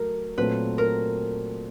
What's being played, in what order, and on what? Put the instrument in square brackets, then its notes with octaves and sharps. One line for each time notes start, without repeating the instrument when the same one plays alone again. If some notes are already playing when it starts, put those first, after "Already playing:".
Already playing: [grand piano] F#3 A3 [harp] A#4
[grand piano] A#2 F#3 A3 C4 [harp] B4
[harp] A#4